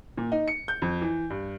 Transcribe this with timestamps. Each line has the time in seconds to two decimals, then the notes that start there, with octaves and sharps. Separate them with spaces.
0.18 A#2
0.32 D#4
0.48 C#7
0.68 G6
0.82 F2
1.01 E3
1.30 G2